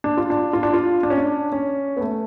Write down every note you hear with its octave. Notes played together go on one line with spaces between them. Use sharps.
D4
F4
D4
F4
D4
F4
D4
C#4
D4
C#4
B3
A3